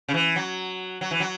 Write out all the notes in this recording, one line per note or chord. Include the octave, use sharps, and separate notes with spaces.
C#3
E3
F#3
F#3
E3
F#3